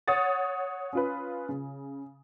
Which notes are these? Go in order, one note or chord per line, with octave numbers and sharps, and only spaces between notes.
C#5 F#5 D#6 A6
C#4 F4 B4
C#3